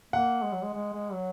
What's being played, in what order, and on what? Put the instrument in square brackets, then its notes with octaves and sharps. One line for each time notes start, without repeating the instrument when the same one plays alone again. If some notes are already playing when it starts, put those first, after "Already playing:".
[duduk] A#3 [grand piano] F#5
[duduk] G#3
F#3
G#3
G#3
G#3
F#3